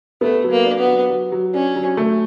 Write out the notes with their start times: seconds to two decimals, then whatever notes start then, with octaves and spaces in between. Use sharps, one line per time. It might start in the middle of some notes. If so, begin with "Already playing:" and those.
0.21 A3 B3
0.44 F#3
0.51 A#3
0.65 D4
0.79 B3
0.87 F#3
1.10 F#3
1.32 F#3
1.54 C#4 D4
1.76 F#3
1.97 A3